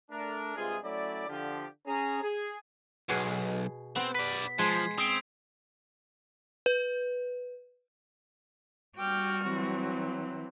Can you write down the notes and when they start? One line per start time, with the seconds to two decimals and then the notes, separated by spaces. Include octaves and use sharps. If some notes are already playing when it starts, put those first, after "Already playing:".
0.11 A3 D4 A#4
0.56 G2 C3 G#3 F4 G#4
0.85 F#3 A3 C#4 E4 D5
1.29 D3 F3 G4
1.87 C#4 G#4 A#5
2.23 G#4
3.09 B1 B2 G#4
3.96 B3 C4
4.15 B4 D5 B6
4.59 F3 G#3 G#6 C7
4.98 C4 D#6 C7 D7
6.66 B4
8.98 G3 F#4 G5 D6 F6
9.43 E3 F#3 C4